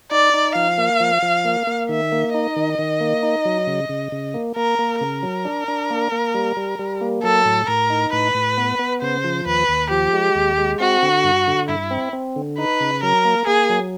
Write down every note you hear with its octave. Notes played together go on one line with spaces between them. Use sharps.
D#4 D5
D#4
F3 F5
A#3
F3
F3
A#3
A#3
D#3 E5
A#3
D#4 D#5
D#3
D#3
A#3
D#4
F#3
C#3
C#3
C#3
A#3
A#3 A#4
A#3
C#3 A#4
F#3
D4
D4
A#3
A#3
G3
G3
G3
A#3
F#3 A4
A2
A2 A#4
D#4
A2 B4
A2
B3
B3
C#3 C5
F3
D#2 B4
D#2
F3 G4
G#3
D#2
G#3
C4 F#4
D3
G2
D3
G2 E4
C4
C4
D3
D#4 B4
C#3
F#3 A#4
A#3
A#3 G#4
F#3